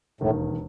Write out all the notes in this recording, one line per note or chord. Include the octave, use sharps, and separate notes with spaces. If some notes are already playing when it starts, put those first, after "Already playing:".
E1 D#2 A2 D#3